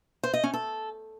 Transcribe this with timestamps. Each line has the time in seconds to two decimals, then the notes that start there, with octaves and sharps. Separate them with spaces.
0.23 C5
0.34 D#5
0.44 C#4
0.54 A4